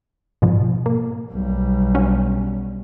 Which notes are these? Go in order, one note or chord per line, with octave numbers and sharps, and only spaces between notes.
G#2 B2 F3
A#3
B1 G3
F#3 C#4 D4